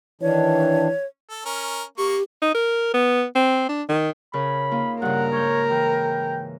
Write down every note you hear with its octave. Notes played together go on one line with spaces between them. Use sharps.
D#3 E3 D4 C#5
A4
C#4 A#4
A#3 G4 C#6
D#4
A#4
B3
C4
D4
D#3
C#3 A#4 C#5 B5
A#3 D#4 F4
G2 C#3 A#4 F#5
G#2 C#5 G6
E3 G5